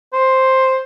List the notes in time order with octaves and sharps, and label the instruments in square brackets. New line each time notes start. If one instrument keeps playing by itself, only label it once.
[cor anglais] C5